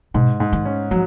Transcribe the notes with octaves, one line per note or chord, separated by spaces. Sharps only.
G#2 B2
G#2
D#3
C#4
F3 F#3